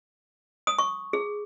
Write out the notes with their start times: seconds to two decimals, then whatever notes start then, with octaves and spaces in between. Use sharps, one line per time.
0.67 D#6
0.78 C#6
1.13 G#4